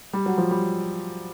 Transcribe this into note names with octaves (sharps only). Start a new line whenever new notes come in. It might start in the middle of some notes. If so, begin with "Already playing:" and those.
G3
F#3
F3
G3